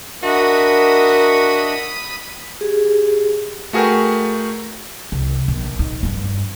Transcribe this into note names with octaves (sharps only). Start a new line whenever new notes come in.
D4 F#4 A#4 D#5 E5 B5 D#6
G4 G#4
A3 F#4 G#4 A#4 B4 G5
C2
A#1
D#4
G2 C#4